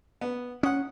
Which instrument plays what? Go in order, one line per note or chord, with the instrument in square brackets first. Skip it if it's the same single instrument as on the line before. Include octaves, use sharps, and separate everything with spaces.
[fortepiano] B3
[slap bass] C#4 [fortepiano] F#5 D#6